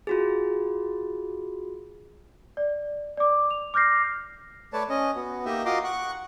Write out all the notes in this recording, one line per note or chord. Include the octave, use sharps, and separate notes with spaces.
F4 F#4 G#4
D5
D5 D6
F7
D6 F6 G6 A#6 C7
A3 B4 C#5 D5 A5
C#4 D#5
B3 F#4
A#3 D#4 G4 D#5 E5
F4 F#4 D#5 A#5 C6 D6
F#5 C#6 F#6